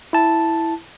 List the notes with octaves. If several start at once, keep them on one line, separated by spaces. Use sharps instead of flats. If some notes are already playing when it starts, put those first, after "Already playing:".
E4 A5